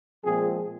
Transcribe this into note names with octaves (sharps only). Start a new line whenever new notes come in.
A#2 F3 G#3 C4 G#4